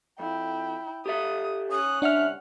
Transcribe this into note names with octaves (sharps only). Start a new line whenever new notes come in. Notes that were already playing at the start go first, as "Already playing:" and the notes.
F2 E4 G5
G4 A4 E5 D#6
C#4 D#6 F#6
C2 D4 E5 F#5 F6